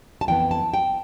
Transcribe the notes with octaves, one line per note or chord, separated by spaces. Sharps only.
A5
F2 E3 B3 G5
A5
G5